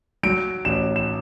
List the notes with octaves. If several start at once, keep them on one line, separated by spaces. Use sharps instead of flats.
F#3 D7
A1 E7
E7